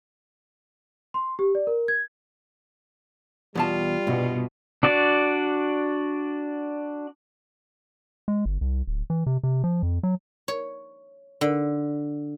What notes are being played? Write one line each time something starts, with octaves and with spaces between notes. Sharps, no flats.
C6
G4
D5
A#4
G#6
E2 B2 G3 F4 A5
C2 G2 B2
D4 F#4 D5
G#3
G1
C2
D1
E3
C3
C3
F3
F2
F#3
C#5
D3